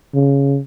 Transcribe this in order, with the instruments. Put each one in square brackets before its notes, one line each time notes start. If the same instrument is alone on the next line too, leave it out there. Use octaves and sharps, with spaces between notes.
[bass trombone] C#3